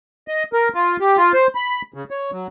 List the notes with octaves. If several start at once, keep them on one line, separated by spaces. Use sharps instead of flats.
D#5
A#4
F4
G4
F4
C5
B5
C#3
C#5
F#3